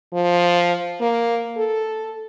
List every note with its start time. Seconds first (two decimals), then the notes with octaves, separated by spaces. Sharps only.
0.13 F3
1.01 A#3
1.57 A4